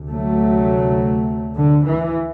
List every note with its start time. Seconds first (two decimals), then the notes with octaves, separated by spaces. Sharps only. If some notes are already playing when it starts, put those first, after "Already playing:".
Already playing: D2 C3
0.12 F#3 A3
1.57 D3
1.85 E3